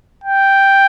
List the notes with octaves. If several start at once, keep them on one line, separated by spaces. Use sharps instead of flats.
G5